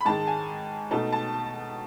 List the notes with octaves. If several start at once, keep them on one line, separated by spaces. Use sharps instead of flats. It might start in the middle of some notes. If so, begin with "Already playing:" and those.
B5
G#2 D#3 G#3 A5
G#5
B2 A3 D#4 A5
A5